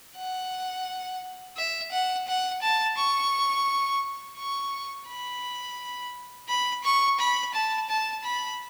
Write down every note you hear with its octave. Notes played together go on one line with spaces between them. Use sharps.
F#5
E5
F#5
F#5
A5
C#6
C#6
B5
B5
C#6
B5
A5
A5
B5